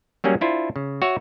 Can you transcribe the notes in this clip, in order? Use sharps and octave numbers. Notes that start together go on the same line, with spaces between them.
F#3 G3 A#3 C#4 G#4
D4 E4 F4 C5
C#3
F#4 C#5 E5